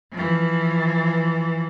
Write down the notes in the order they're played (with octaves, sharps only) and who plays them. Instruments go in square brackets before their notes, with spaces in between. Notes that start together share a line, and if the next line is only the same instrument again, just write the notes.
[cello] E3 F3